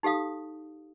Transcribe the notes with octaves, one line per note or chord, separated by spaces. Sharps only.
D#4 G4 A4 F5 D#6